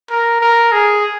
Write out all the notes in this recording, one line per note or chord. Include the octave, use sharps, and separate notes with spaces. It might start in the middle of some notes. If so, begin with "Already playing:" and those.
A#4
A#4
G#4